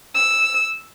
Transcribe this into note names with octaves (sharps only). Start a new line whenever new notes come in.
E6